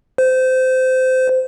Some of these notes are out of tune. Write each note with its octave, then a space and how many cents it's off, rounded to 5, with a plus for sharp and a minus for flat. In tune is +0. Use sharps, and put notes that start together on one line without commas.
C5 -20